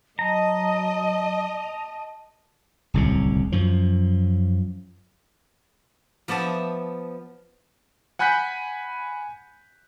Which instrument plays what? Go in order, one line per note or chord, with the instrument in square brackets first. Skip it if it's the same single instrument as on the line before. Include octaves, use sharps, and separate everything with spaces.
[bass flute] F#3 [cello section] D#5 [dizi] A5 [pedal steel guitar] A#5
[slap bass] D1 C2 C#3
F#2 F3
[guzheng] F3 B3 D5 E5 A5
[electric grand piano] F#5 G#5 B5 F#6 G6 B6